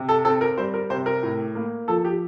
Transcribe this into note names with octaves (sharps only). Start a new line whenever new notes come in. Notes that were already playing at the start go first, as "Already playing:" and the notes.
Already playing: C3
A4
C4 A4
A#4
G3 C5
A#4
C3 C5
A#4
A2
A#3
F3 A4
G4